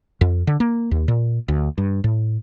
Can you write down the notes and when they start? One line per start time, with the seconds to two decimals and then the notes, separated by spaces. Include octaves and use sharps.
0.21 F2
0.47 D3
0.60 A#3
0.91 D#2
1.08 A#2
1.48 D2
1.78 G2
2.04 A2